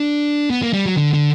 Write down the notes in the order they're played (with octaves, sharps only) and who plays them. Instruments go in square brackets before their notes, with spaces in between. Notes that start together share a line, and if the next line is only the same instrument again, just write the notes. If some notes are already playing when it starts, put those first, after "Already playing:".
Already playing: [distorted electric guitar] D4
B3
A#3
G3
F#3
D3
D3